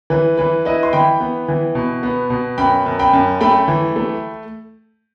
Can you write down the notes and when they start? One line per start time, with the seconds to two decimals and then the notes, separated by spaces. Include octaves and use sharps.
0.10 E3 B4
0.38 E3 B4
0.65 E4 B4 D#5
0.83 C6
0.93 E3 G5 B5
1.20 B3
1.48 E3
1.75 B2
2.03 B3
2.30 B2
2.58 F#2 G5 B5
2.86 F#2
2.99 G5 B5
3.13 F#2
3.41 A3 G5 B5
3.68 E3
3.96 A3